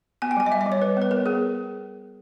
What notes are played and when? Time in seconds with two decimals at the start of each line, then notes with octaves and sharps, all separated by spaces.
0.22 B3 G#5
0.31 G5
0.37 G3 G#5
0.46 D#5
0.51 G3 E5
0.61 D#5
0.66 G3
0.72 C#5
0.82 G3 B4
0.97 B3 B4
1.11 B3 A#4
1.26 B3 G#4